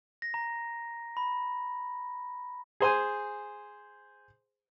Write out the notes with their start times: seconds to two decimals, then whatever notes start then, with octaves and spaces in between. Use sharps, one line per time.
0.22 A#6
0.34 A#5
1.17 B5
2.80 G#4 C5 G#5